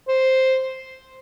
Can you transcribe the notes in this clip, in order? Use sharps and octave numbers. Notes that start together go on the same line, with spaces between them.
C5